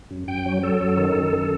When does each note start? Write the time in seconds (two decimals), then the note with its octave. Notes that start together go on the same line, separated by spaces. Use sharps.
0.11 F#2
0.28 F#2 G5
0.46 F#3
0.63 F#3 A4
0.80 F#2
0.97 D#3
1.15 F#2
1.32 D#3